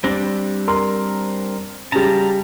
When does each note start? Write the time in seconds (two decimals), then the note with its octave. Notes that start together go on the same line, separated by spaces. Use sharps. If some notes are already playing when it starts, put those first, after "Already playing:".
0.04 G3 C4 D4 A#6
0.68 A#4 C6
1.92 C#3 G3 A5 A#5